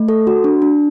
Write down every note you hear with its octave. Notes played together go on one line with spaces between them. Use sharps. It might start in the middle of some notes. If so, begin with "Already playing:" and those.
Already playing: A3
A4
F#4
D4
D4